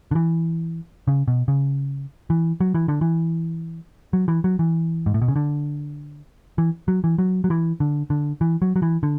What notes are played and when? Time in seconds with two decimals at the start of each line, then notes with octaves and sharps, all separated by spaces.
0.11 D3
0.15 E3
1.08 C#3
1.28 B2
1.48 C#3
2.30 E3
2.60 F#3
2.74 E3
2.88 D3
3.01 E3
4.13 F#3
4.28 E3
4.44 F#3
4.59 E3
5.06 G#2
5.14 A2
5.22 B2
5.28 C#3
5.36 D3
6.58 E3
6.88 F#3
7.04 E3
7.18 F#3
7.44 F#3
7.50 E3
7.80 D3
8.10 D3
8.41 E3
8.62 F#3
8.76 F#3
8.82 E3
9.03 D3